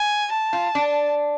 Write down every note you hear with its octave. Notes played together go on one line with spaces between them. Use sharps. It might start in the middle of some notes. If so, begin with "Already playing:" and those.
Already playing: G#5
A5
F4
D4